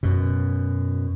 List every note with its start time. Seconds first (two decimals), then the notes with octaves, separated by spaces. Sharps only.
0.03 F#2 B2